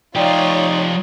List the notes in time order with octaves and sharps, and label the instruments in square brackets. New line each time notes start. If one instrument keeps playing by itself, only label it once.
[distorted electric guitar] F3 G4 [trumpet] D#4 [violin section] F4 C#5 [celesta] D5 G5